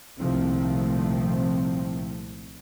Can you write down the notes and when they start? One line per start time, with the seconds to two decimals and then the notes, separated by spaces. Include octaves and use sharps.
0.19 C2 A#2 D#3 F3 A3 C4